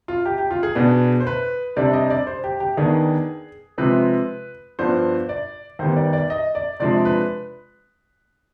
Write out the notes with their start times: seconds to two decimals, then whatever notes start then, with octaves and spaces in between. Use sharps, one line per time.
0.08 F4
0.26 G4
0.38 G4
0.51 F4
0.63 G#4
0.75 B2 B3 D4
1.20 C5
1.27 B4
1.76 C3 G3 D4 D5
1.93 D#5
2.10 D5
2.27 C5
2.44 G4
2.60 G4
2.77 D#2 D#3 B3 D4 G#4
3.78 C3 F3 G#3 C4 B4
4.79 G2 F3 B3 D4 C5
5.29 D5
5.79 D#2 D#3 G3 B3 C5
5.96 D5
6.13 D5
6.30 D#5
6.55 D5
6.80 C3 F3 G#3 D4 D5
7.05 B4